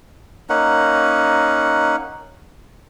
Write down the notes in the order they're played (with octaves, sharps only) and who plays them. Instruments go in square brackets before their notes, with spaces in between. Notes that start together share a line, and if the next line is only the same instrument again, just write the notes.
[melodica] A#3 C#4 D#4 F#5